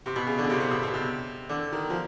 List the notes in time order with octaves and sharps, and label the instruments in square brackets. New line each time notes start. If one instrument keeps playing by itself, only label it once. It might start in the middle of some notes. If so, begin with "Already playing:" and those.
[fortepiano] C3
B2
C#3
D3
C#3
C3
C3
B2
B2
C3
D3
D#3
F3